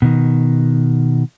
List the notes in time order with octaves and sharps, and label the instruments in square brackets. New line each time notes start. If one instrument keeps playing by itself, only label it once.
[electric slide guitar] B2 D#3